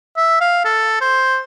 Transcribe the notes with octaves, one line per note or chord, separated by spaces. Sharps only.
E5
F5
A4
C5